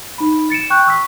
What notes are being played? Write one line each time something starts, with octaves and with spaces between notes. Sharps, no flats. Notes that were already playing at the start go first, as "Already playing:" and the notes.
D#4 B5
A6 C#7 D7 E7
G5 C#6 F#6 G6
C#6 E6 B6